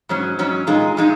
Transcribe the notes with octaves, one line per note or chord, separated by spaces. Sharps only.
G#2 F#3 C#4
G#2 F#3 C#4
A#2 G#3 D#4
A#2 G#3 D#4